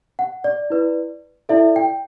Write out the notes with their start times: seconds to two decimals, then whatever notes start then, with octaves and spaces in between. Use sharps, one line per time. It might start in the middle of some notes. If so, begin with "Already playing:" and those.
0.19 F#5
0.44 D5
0.70 E4 B4 D5
1.49 E4 A4 D5 E5
1.76 G5